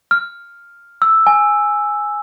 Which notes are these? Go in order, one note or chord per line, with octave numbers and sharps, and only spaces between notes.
F6
E6
G#5